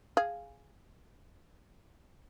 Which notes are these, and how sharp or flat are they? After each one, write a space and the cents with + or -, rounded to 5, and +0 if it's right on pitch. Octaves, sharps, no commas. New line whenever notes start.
G#4 +0 F5 +0